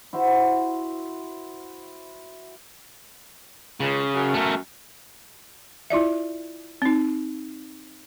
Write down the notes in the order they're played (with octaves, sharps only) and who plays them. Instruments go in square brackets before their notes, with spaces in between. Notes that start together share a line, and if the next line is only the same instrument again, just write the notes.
[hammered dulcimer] E4 F#4 C5 E5
[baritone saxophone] C#2 [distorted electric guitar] C#3
[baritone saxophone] F#2
[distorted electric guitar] A3 A#4
[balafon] E4 F4 D5 E5
C4 D#4